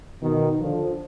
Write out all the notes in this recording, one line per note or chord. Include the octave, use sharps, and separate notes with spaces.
B2 D#3
D3 F3